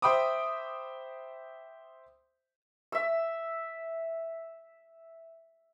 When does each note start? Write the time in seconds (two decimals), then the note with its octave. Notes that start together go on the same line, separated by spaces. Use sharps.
0.02 C5 E5 G5 B5 D6 D#6
2.92 E5 E6